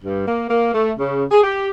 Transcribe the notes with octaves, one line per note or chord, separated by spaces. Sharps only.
G2
A#3
A#3
A3
C#3
G#4
G4